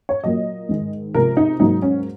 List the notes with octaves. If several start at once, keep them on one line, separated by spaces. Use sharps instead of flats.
C#5
A#2 F#3 A#3 D#5
G#2 D#3 G#3
C3 F3 G#3 A#4
D#4
G#2 F#3 A#3 D#4
C#4